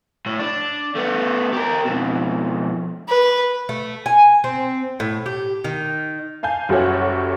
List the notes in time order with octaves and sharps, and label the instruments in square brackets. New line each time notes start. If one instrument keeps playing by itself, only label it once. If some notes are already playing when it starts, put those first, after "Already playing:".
[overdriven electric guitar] A2
D4
A3 B3
G4 A#4
F2 B2
[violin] B4
[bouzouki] A3
G#5
C4
A2
G4
D#3
[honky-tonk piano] F5 G#5 A5 G6
F#1 G3 F#4 A4 C#5 F#5